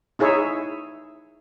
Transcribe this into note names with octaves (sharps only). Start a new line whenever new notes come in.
D#4 E4 G#4 C#5 E5